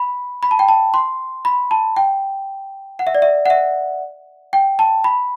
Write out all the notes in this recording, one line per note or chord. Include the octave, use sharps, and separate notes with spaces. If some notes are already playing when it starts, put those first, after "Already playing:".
Already playing: B5
B5
A5
G5
A5
C6
B5
A5
G5
F#5
E5
D5
E5
F#5
E5
G5
A5
B5